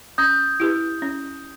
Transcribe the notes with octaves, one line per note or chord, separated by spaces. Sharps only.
C#4 D#6 G6
E4 G4 B4
C#4